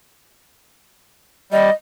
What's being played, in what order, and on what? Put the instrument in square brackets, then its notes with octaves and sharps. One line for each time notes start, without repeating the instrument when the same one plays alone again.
[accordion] G3 [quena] D#5